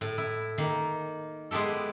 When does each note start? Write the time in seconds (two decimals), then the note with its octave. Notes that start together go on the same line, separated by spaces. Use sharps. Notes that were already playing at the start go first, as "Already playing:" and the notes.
0.01 A2
0.18 E4
0.58 D#3 A#3
1.51 G#3 B3 E4 G4 A4